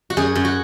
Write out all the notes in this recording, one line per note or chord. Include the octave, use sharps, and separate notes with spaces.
F#4
F#2 G#4
F#2
F#4